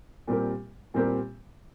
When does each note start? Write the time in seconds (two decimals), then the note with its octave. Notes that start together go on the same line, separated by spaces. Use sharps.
0.28 A#2 G3 C4 G4 A#4
0.94 A#2 G3 C4 G4 A#4